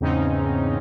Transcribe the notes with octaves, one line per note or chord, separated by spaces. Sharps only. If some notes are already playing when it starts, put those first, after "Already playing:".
E2 G#2 C#3 C4 C#4 D#4